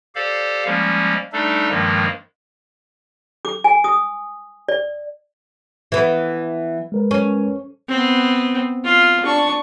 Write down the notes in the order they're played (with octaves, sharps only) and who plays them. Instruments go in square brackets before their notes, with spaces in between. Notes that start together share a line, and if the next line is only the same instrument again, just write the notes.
[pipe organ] G4 A4 C5 D5 F5
F3 G3 G#3 A#3 C#4
G3 A3 D4 D#4 A4
G2 D#3 F3 G#3 A#3
[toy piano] D6
G#5
D#6
D5
[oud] E3 B3
[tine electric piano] G#3 A#4 B4
[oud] C#4
[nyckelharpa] B3 C4
F4
D4 C#6